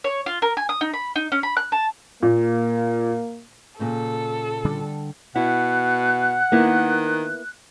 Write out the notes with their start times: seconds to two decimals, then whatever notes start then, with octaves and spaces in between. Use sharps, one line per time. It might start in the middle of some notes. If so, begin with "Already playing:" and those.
0.04 C#5
0.26 F4
0.42 A#4
0.57 G#5
0.69 D#6
0.81 D#4
0.93 B5
1.16 D#4
1.32 C#4
1.43 B5
1.57 F#6
1.72 A5
2.23 A#2 A#3
3.79 A#2 C#3 A4 C5
4.65 D3 G3 D4
5.36 B2 E4 F#5 F#6
6.52 D#3 A#3 B3 E4